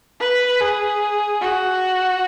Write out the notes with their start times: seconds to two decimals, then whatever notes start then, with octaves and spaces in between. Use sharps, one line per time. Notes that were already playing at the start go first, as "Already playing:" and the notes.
0.20 B4
0.61 G#4
1.41 F#4